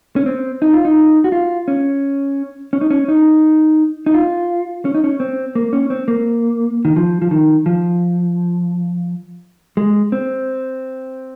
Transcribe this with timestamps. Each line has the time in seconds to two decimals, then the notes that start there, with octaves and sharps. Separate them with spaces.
0.16 C#4
0.26 C4
0.62 D#4
0.73 F4
0.85 D#4
1.24 F#4
1.32 F4
1.68 C#4
2.73 C#4
2.81 D#4
2.90 C#4
3.08 D#4
4.06 D#4
4.14 F4
4.85 C#4
4.95 D#4
5.04 C#4
5.20 C4
5.55 A#3
5.73 C#4
5.90 C4
6.08 A#3
6.85 D#3
6.96 F3
7.22 F3
7.31 D#3
7.66 F3
9.77 G#3
10.12 C4